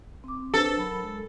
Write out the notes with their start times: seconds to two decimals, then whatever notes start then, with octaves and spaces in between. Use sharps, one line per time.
0.24 C4 D6
0.54 D4 A4 B4 C5
0.77 F#3 A#4 B5
1.03 G#3